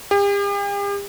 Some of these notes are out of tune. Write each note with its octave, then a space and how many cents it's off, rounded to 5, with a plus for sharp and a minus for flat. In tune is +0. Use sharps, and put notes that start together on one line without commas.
G4 +45